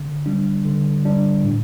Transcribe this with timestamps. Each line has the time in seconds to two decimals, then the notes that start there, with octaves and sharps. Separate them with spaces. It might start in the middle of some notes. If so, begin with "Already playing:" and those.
Already playing: D3
0.26 G3 D4
0.65 D3
1.05 G3 D4
1.44 A2